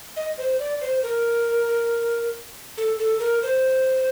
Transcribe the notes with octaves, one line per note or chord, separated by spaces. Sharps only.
D#5
C5
D5
C5
A#4
A4
A4
A#4
C5